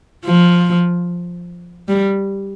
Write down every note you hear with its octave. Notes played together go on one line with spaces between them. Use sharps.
F3
G3